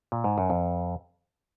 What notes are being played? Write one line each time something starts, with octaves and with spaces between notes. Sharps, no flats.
A#2
G#2
F#2
F2